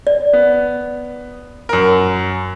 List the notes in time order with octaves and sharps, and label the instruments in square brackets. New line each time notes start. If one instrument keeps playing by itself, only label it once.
[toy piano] D5
[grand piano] B3
F#2 A#4